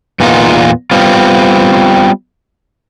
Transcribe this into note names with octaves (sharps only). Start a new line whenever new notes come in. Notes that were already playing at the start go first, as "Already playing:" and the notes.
E2 A#2 B3 D#4 F4
G3 B3 C4 F4